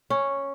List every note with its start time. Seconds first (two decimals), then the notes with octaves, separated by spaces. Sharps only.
0.10 C#4